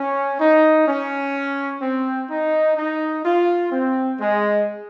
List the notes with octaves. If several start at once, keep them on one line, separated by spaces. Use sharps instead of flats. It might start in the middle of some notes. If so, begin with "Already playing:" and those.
Already playing: C#4
D#4
C#4
C4
D#4
D#4
F4
C4
G#3